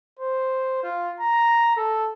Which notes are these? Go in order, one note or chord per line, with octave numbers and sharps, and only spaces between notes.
C5
F4
A#5
A4